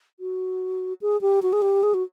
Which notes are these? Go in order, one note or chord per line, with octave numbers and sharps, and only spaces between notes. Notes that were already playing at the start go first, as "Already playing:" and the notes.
F#4
G#4
G4
F#4
G#4
G4
G#4
F#4